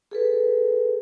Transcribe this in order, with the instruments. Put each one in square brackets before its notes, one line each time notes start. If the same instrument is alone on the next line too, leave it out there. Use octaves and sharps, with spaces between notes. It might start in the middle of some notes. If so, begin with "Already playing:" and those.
[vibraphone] G#4 A4 B4